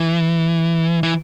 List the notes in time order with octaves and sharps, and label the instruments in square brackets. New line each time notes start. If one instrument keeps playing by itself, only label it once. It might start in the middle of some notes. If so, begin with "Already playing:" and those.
Already playing: [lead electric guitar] E3
E3